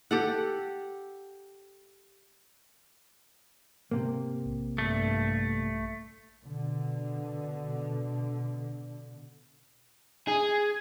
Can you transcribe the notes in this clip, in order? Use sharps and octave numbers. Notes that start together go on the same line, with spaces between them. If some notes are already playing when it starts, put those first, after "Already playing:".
G4 A4 F#5
G#2 C3 A#3
A#1
G2 A3
B2 D3
G#4